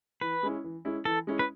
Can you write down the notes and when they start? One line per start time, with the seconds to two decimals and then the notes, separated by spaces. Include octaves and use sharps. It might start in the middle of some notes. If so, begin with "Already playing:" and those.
0.21 E3 B4
0.43 G#3 C#4 E4
0.64 E3
0.85 G#3 C#4 E4
1.05 E3 A4
1.27 G#3 C#4 E4
1.39 B4